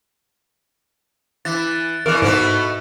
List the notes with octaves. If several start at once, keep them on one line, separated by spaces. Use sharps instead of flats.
E3 A6
E2 E3 A#4
G#2 B2 A3 B3